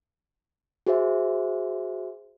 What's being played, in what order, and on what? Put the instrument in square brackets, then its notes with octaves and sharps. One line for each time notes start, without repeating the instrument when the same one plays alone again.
[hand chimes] F#4 G#4 C5 E5